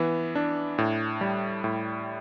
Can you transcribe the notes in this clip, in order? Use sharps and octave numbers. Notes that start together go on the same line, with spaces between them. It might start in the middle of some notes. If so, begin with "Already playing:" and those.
Already playing: E3 B3
D4
A2
G3
A2